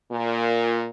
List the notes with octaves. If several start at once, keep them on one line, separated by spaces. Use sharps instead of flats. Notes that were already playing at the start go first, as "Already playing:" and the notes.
A#2